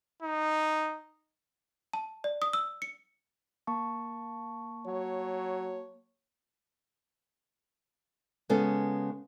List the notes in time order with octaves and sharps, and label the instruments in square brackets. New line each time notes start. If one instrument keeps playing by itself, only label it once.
[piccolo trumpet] D#4
[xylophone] A5
D5
D#6
E6
C#7
[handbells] A#3 A5 C#6
[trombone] F#3 [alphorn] C#5
[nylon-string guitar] C#3 G#3 B3 C#4 A4